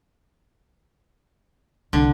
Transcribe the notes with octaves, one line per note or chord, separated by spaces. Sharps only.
C2 D3 E3